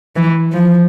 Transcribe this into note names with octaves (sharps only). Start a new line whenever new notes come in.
E3
F3